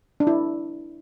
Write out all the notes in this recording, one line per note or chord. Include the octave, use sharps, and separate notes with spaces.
D4
E4